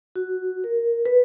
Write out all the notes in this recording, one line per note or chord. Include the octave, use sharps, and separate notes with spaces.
F#4
A#4
B4